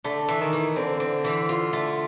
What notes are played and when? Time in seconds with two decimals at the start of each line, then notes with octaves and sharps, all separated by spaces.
0.05 D3 A3
0.29 E3
0.41 D#3
0.53 E3
0.76 D3 C4
1.00 C4
1.24 E3
1.49 F4
1.73 A3